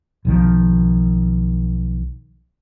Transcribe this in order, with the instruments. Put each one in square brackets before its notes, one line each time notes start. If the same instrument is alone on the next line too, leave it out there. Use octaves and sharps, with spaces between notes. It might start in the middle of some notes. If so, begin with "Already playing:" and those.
[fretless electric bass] B1 D#3 F3